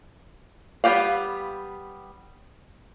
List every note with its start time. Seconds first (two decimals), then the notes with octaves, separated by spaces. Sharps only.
0.84 G3 B3 G4 D5 F5